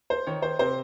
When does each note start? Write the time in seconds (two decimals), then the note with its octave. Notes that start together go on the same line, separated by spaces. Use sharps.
0.10 C5
0.27 D#3 C#5
0.42 C5
0.59 C3 C5